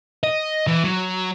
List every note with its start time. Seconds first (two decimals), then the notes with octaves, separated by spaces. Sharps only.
0.23 D#5
0.67 E3
0.84 F#3